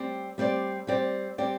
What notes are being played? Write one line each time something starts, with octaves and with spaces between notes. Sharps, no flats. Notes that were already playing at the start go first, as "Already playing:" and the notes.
Already playing: G3 C4 G4 D5
G3 C4 G4 D5
G3 C4 G4 D5
G3 C4 G4 D5